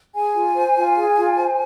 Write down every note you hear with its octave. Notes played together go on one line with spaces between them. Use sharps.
G#4 G#5
F4
C5
F4
G#4
F4
C5